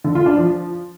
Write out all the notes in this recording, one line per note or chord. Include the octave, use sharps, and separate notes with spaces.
D3
F4
D4
F3